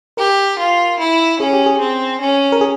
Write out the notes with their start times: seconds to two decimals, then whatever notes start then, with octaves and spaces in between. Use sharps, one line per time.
0.17 G4 A#4
0.59 F4
0.99 E4
1.39 C#4 G#4
1.53 G4
1.66 G#4
1.80 C4
2.21 C#4
2.52 A#4
2.61 G#4